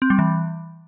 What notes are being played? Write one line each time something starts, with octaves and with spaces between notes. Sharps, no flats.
C4
G3
E3